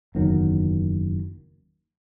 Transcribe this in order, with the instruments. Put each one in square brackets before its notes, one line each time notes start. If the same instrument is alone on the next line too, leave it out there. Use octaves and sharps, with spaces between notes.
[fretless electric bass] F#1 E2 D#3 F#3